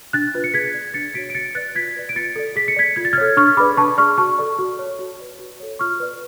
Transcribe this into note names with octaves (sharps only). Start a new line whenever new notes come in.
D4 F#6 A6
F4 B4
C#7
G#4 G#6 B6
D5
D4 A6 C#7
F#4 C#5 B6 D7
D7
F#4 A6 C#7
B4 D5 F#6 A6
F4 G#6 B6
B4 D5
D7
F4 A6 C#7
A4 D5
G#4 B6
C#7
D5 G#6 B6
F4 G#6
A6
F6 G#6
A4 C#5
D4 C#6 F6
G#4 B4 D5 B5 D6
D4 A5 C#6
G#4 D5 C#6 F6
F#4 A5 C#6
A4 D5
F#4
C#5
F#4
B4 D5
F#4
A4 C#5
F4 C#6 F6
B4 D5